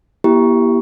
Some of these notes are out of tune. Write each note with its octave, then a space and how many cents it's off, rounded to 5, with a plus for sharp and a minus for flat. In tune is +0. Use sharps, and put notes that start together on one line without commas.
A#3 +45 E4 +10 G4 +0